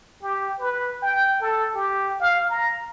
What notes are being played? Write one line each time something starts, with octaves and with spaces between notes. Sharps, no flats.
G4
B4
G5
A4
G4
F5
A#5